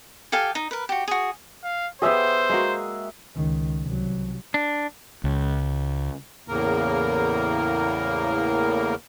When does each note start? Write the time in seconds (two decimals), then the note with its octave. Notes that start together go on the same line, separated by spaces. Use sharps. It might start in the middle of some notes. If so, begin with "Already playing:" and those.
0.32 G4 A4 F5 G#5
0.55 D#4
0.71 A#4 B4
0.89 F#4 G4
1.08 F#4 G#4
1.63 F5
2.02 B3 G4 G#4 C5 D#5 E5 G#5
2.49 G#3 A#3 F#4
3.35 C#2 D#3
3.82 C2 F#3
4.54 D4
5.24 C#2
6.48 E2 A2 C#3 A#3 A#4